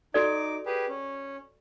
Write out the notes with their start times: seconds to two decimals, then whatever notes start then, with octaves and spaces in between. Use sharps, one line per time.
0.14 D#4 F#4 A4 D5 D6
0.66 G4 G#4 B4
0.88 C#4